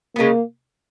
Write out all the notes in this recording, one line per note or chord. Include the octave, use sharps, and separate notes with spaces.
C#3 G#3 A#3 B3